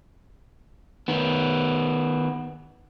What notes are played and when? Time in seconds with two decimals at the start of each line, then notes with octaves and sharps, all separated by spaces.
1.08 D#3 B3